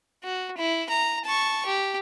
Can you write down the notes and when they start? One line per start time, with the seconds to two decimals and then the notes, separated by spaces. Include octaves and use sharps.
0.24 F#4
0.57 E4
0.89 A#5
1.25 A5 C#6
1.66 G4